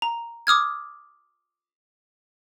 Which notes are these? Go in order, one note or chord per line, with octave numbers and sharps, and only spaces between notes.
A#5
D6 D#6 F6 G#6